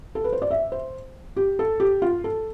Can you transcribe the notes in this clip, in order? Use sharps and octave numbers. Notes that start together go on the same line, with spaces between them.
A4
B4
C5
D5
E5
C5
G4
A4
G4
F4
A4